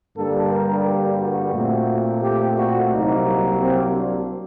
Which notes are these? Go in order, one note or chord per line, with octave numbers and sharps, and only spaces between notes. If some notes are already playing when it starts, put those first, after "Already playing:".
G2 D3 G3 A#3 A4
A#4
G4
F#4
A#2 A3 C4
G4
F#4
C2 C3 F#3 A#3 D#4
C4
D4